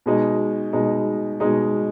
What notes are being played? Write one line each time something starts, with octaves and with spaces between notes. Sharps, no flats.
B2 G#3 D#4
B2 G#3 D#4
B2 G#3 D#4